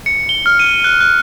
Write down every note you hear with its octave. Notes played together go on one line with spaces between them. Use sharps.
C#7
G7
F6
D#7
F#6
F#6